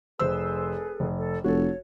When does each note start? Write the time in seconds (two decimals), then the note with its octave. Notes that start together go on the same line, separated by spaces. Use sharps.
0.19 F1 G#4 A4 B4 C5 E6
1.00 F1
1.19 A4
1.44 F1 F#4 A4 C#5